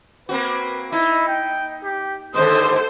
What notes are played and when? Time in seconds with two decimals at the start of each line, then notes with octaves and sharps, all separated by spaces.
0.29 A#3 C4 F#4 B4
0.92 D#4 E4
1.28 G5
1.84 G4
2.34 D#2 G#2 D3 A4 C5 D#6